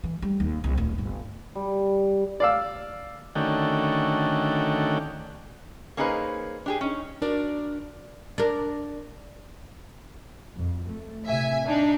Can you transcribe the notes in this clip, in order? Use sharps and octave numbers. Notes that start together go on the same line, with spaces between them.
E3
G3
D#2
C2
D1
G1
G3
D5 F5 E6
D3 D#3 A3 C#4 F#4 G5
A#3 C#4 D#4 G#4 B4 C5
D4 G4 G#4
C#4 D#4
D4 F#4 A#4 D5
D4 A#4
F2
A3
A2 C3 E5 G#5
D4 D#4